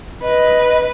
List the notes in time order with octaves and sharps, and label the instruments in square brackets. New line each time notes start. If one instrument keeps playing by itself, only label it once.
[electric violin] B4 [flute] D#5